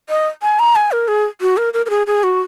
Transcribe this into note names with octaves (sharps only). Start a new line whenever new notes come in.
D#5
G#5
A#5
G#5
A#4
G#4
F#4
A#4
A#4
A#4
G#4
G#4
F#4